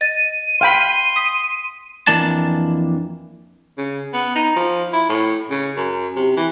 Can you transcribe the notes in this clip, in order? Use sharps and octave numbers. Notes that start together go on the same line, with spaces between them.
D#5 A6 D#7
F5 G5 B5 C6
D#6 B6 C7
F2 E3 A#3 D4 A5
C#3
B3
D#4
F3
E4
A2
C#3
F#2
C3
E3